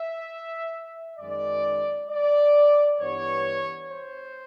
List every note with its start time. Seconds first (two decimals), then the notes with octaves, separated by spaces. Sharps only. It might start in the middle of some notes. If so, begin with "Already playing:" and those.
Already playing: E5
1.19 F#2 D#3 G#3 D5
2.10 D5
2.99 G2 E3 G3 B3 C#5
3.89 C5